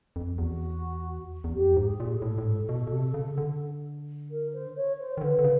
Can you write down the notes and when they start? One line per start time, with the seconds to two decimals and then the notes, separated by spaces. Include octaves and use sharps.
0.16 F2
0.38 E2 F#4
1.44 E2
1.53 F2 G4
1.76 G#2
1.84 G#4
2.00 A#2
2.15 A4
2.22 A2
2.38 A2
2.45 G#2
2.69 B2
2.87 B2
2.92 C3
3.14 C#3
3.38 D3
4.30 A#4
4.53 C5
4.75 C#5
4.99 C5
5.17 D#3
5.21 D3 B4
5.39 D3
5.44 C#3